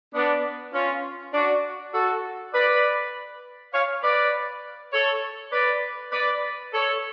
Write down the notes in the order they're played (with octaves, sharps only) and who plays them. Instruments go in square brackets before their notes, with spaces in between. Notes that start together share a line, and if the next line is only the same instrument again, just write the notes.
[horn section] B3 D4
C#4 F4
D4 F#4
F#4 A4
B4 D5
C#5 F5
B4 D5
A4 C#5
B4 D5
B4 D5
A4 C#5